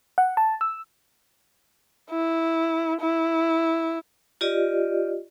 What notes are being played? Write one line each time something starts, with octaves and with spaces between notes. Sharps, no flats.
F#5
A5
E6
E4
E4
F4 G4 D5 D#5